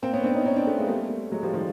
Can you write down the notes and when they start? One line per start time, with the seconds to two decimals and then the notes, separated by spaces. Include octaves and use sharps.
0.02 A#3 C4
0.13 B3 C#4
0.24 C4 D4
0.35 C#4 D#4
0.46 C#4 D#4
0.56 C4 D4
0.67 A3 B3
0.78 G#3 A#3
0.89 G3 A3
1.32 F#3 G#3
1.43 F3 G3
1.54 D#3 F3